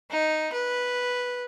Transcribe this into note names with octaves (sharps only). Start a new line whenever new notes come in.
D#4
B4